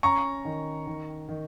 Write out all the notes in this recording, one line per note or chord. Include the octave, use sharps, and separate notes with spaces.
C#4 A#5 C#6
D#3
D#3
D#3